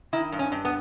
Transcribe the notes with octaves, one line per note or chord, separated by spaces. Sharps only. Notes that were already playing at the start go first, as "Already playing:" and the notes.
D#3 E4
G2
C#4
G2
B3